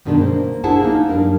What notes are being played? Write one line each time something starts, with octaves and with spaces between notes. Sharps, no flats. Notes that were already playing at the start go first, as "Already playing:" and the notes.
G2 B2 D#3 G#3 C#4 D4
A#3 C5
D4 E4 G#4 C5 F#5 A5
A#3 C#4 D#4
F#2 G3 D4 A#4